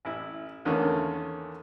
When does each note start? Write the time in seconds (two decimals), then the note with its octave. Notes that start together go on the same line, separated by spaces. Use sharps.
0.05 A1 E4
0.65 E2 D3 D#3 A3 A#3 C#4